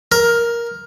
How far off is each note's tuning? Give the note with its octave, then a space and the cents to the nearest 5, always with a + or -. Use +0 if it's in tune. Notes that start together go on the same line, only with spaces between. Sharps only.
A#4 +10